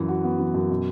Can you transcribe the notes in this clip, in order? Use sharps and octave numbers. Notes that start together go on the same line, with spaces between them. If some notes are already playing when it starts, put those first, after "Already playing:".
Already playing: F#2 E3
F#4
B3
E3
F#2
B2